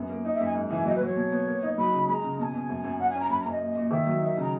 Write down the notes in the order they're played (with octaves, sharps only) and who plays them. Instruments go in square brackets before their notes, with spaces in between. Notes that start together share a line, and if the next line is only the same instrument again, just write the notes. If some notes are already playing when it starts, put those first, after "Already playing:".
Already playing: [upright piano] F#2 B3
A#3
D#4
[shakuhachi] E5
[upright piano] F#2 [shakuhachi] G#5
[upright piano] G#2
[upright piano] E3 [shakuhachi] G#5
[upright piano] F#3 [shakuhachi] D#5
[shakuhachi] B4
[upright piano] F#3
[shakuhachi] C#5
[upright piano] B2
B3
A#3
D#4
[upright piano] F#3 [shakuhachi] B5
[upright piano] C#3
[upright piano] G#3 [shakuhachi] A#5 B5
[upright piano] C#3
[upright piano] B2 [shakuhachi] G#5 A#5
[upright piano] B2
F#2
F#2
[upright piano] C#4 [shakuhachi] F#5
[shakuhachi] G#5
[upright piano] C#4 [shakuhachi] A#5
[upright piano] F#2 [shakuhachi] B5
[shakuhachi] A#5
[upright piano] F#2
[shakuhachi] D#5
[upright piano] A#2
A#2
[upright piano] D#3 [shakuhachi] E5
[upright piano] F#3
D#4
[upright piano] C#3 [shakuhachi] A#5